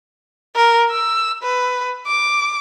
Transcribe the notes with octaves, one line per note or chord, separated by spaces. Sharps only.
A#4
E6
B4
D6